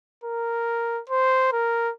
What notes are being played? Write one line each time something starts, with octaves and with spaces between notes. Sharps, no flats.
A#4
C5
A#4